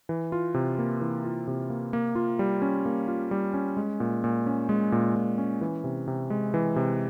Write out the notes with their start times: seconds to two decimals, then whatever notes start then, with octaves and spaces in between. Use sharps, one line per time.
0.09 E3
0.32 F4
0.54 C3
0.78 A#3
1.01 E3
1.24 F4
1.47 C3
1.70 A#3
1.93 A#3
2.15 F4
2.39 G3
2.62 C#4
2.86 A#3
3.08 F4
3.31 G3
3.54 C#4
3.77 G#3
4.00 A#2
4.24 A#2
4.46 C#4
4.69 G#3
4.92 A#2
5.16 A#2
5.38 C#4
5.61 E3
5.84 C3
6.08 C3
6.30 G#3
6.54 E3
6.76 C3